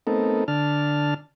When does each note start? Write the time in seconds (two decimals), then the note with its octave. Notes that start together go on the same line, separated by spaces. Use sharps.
0.07 A3 B3 C4 D#4 A4 A#4
0.48 D3 D4 A5 F6